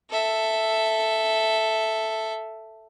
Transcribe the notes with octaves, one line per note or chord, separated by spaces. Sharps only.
A4 E5